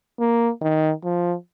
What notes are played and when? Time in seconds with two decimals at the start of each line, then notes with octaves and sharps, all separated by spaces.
0.20 A#3
0.61 D#3
1.04 F3